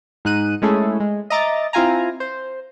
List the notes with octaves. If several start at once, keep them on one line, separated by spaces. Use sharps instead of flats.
G#2 D#4 F#6 D#7
G#3 A3 C#4 E4 G#4 A4
G#3
D#5 E5 A#5 D6 A6
C4 E4 F4 F5 G#5 A#5
C5